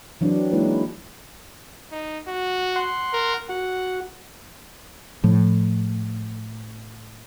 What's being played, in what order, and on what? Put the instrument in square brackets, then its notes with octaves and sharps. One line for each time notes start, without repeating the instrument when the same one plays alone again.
[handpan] E3 F#3 C4 D4
G#3 A#3 D#4 E4 B4
[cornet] D#4
F#4
[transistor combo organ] F#5 C6
[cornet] A#4
[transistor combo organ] F#4 [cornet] F#5
[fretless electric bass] A2 [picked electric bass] F3